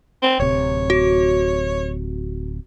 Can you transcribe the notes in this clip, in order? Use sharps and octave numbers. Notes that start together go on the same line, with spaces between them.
C4
D1 C3 C#5
F#4